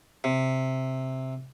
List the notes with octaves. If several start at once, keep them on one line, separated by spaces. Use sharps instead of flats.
C3